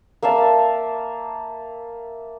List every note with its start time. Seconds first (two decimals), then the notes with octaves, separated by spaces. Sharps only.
0.22 A#3 E5 F5 A5